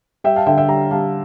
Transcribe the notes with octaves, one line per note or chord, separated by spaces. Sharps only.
G3 E5 G5
F5 A5
D3 E5 G5
E5 G5
G3 G5 A#5
G3 F5 A5